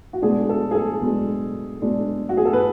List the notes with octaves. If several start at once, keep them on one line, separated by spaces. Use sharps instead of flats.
F#4
B2 G#3 D4 G#4
A4
G#4
A4
B2 G#3 D4
B2 G#3 D4
F#4
G#4
A4
B4